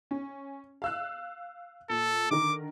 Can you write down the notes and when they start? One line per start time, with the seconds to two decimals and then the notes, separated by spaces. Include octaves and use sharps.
0.11 C#4
0.82 F5 E6 F#6
1.90 A#2 A4
2.31 D3 D#3 A#4 D6